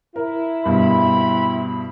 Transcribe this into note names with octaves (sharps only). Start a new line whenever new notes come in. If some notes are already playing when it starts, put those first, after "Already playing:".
E4 A#4
G2 B2 C4 B5